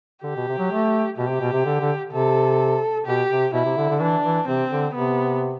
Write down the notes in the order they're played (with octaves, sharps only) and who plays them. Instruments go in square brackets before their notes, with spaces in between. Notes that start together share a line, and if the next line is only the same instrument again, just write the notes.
[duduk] D3 [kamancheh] G4
[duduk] B2
C3
F#3
A3
[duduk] B2 [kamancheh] G4
[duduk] C3
B2
C3
D3
D3
[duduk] C3 [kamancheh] A4
[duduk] B2 [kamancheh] G4
[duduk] C3
[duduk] B2 [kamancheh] E4
[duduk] C3
D3
D3
[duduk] E3 [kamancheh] D4
[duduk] E3
[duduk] C3 [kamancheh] C4
[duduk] D3
[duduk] C3 [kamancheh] B3